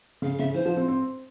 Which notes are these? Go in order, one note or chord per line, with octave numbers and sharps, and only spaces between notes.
C#3 F5
C#3 E5
E3 C5
F3
C4
C4